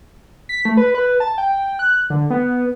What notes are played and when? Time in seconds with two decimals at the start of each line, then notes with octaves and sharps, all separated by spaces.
0.49 B6
0.65 A3
0.77 B4
0.94 B4
1.20 A5
1.38 G5
1.79 F#6
2.10 D3
2.30 B3